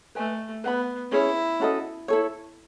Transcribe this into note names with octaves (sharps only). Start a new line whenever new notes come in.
A3 B4 D#5 G#5
B3 B4 F#5 B5
C#4 E4 G#4 C#5
C#4 F#4 A4 D#5
E4 A4 C#5